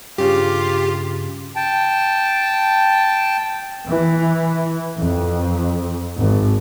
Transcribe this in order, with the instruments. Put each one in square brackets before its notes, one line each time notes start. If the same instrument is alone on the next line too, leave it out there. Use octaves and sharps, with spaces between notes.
[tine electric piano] G2 C#3 [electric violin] F4 [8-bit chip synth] G4
[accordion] G5 A5
[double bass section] E3
F2
G#1